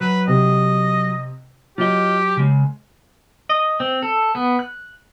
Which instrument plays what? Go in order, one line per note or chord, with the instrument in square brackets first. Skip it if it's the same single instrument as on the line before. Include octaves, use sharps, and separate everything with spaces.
[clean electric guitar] F#3 [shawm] B4
[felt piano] C3 [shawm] D#5
[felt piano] F#3 [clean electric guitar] F4 D#5 [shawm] G4
[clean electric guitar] C#3 G#3
[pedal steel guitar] D#5
C4
A4
B3
F#6